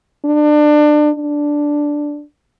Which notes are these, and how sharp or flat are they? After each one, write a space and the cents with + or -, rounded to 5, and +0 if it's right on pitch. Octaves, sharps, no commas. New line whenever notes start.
D4 +25
D4 +0